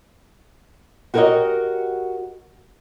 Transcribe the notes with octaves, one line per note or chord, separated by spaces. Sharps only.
F#4 G4 A#4 C5 C#5 D#5